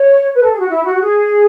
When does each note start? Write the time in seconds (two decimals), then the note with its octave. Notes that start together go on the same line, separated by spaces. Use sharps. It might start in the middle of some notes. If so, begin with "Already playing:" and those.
Already playing: C#5
0.34 B4
0.42 A4
0.52 G#4
0.59 F#4
0.68 E4
0.84 F#4
0.95 F#4
1.01 G#4